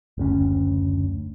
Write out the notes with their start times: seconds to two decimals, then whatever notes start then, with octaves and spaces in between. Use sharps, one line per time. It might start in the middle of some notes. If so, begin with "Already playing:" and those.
0.18 F#1 D2 C#4